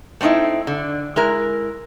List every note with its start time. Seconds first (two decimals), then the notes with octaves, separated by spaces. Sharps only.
0.21 A3 C4 C#4 D#4 E4
0.67 D3
1.16 G#3 E4 A#4